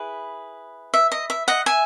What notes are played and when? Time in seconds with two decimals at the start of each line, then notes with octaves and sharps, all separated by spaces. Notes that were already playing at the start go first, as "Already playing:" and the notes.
Already playing: E4 G#4 B4
0.94 E5
1.12 D#5
1.30 E5
1.48 D#5 F#5
1.66 E5 G#5